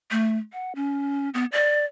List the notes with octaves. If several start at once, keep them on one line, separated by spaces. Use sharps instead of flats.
A3
F#5
C#4
B3
D5